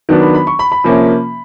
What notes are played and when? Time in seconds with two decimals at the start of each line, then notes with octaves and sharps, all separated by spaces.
0.09 D#3 F#3 B3 D4
0.22 B5
0.34 B5
0.47 C#6
0.59 B5
0.72 B5
0.84 C3 F3 A#3 C#4